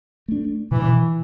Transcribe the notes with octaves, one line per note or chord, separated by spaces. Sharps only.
A3 D4
B2 E3